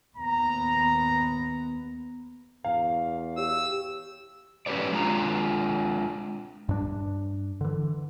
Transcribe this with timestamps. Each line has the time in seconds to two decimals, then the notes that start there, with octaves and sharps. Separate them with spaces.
0.17 D#2 B3 A#5
2.65 E2 F5
3.38 G4 C#5 E6
4.66 C#4 G4 B4 C#5 D5
4.93 G#3 D4 F4 A#5
6.69 G2 D4
7.61 D3 E3